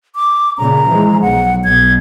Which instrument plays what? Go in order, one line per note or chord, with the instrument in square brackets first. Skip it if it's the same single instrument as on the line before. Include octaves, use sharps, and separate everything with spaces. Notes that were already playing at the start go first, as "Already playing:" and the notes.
[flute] D6
[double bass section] A#2 C#3 [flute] A#5
[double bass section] E3 F3 G#3
[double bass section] B1 [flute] F#5
[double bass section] B1 B2 [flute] G#6